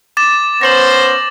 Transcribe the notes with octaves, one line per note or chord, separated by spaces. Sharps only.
D6 A6 E7
B3 C#4 C5 A#6 F#7